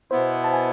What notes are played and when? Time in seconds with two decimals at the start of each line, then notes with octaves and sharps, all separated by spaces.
0.11 B2 B3 E4 C5
0.44 A5
0.53 G#5